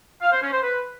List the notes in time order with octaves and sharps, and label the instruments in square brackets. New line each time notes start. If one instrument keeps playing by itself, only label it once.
[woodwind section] F5
C5
C#4
C5
B4